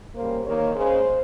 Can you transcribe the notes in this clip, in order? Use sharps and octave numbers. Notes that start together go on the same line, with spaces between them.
C#3 G3 A#3 C5
D#3 A#3 C#5
C#3 G#3 C5